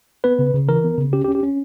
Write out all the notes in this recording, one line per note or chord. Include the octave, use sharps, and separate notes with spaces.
B3 B4
C#3
C#3
E3 A#4
B3
C#3
C#4 G4
G4
C#4
G4
C#4